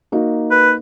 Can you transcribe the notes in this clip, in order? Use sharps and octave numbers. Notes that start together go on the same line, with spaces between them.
A#3 D#4 F#4
B4